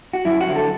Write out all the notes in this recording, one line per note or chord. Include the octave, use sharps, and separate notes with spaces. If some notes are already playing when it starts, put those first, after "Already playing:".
F#4
F#2 E4
F#4
D3 F#3
A4